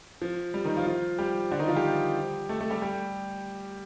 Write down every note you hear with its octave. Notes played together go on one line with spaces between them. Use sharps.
F3
G3
D#3 D#4
F3 F4
F3 F4
G3 G4
D3 D4
D#3 D#4
F3 F4
G3 G4
A3 A4
A3 A4
G3 G4
G3 G4